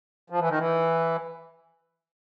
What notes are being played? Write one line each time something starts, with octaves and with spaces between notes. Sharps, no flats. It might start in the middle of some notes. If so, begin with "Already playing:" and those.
F3
E3
D#3
E3